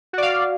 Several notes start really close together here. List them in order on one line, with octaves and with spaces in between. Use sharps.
F#4 D5 F5